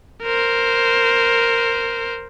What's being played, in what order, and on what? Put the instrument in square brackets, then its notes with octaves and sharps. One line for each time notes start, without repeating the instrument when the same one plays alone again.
[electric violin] A#4 C5